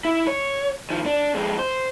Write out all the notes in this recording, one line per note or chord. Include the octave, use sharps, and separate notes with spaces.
E4
C#5
D#3 F3
D4
F2 G#3
C5